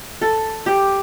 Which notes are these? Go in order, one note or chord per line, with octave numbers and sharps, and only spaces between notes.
A4
G4